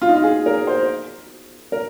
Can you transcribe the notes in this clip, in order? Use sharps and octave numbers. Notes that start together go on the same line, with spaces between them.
F4
D#4
F4
G#4
A#4
C5
A#4